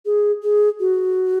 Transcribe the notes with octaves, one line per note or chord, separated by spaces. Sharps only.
G#4
G#4
F#4